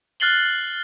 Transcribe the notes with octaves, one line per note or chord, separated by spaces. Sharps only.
F6 F#6 A6 C7 F#7 G7